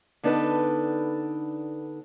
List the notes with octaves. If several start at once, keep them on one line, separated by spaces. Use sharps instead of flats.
D3 B3 D4 D#4 A4 B4